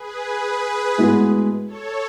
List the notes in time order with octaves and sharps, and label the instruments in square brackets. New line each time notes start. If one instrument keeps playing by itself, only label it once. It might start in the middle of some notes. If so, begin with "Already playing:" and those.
Already playing: [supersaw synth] G#4 B4
G#4 B4
[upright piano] A2 G#3 B3 F#4
[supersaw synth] A4 C#5